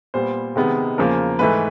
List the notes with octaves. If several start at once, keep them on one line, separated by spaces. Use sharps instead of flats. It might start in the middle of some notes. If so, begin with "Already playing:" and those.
A#2 G3 B3 C5
C3 D#3 G#3 B3
E2 C#3 F3 A#3 A#4
G#2 E3 A3 B4